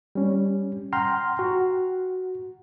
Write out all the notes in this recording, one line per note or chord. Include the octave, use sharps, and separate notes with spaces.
G3 C#4
F#5 G5 A#5 C6 F6
F#4